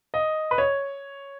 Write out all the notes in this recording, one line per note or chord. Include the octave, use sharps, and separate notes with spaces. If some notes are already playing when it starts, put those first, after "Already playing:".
D#5
B4
C#5